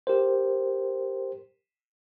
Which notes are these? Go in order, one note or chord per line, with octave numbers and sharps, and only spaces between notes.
G4 A#4 C5